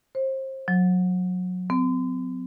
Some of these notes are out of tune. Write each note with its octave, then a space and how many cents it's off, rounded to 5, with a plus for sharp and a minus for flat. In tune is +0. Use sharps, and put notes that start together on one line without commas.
C5 +30
F#3 -25
C4 -40